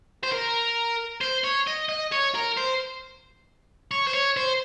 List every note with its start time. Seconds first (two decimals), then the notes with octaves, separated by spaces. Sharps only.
0.23 C5
0.32 A#4
1.21 C5
1.44 C#5
1.67 D#5
1.89 D#5
2.12 C#5
2.35 A#4
2.57 C5
3.91 C#5
4.07 C5
4.14 C#5
4.37 C5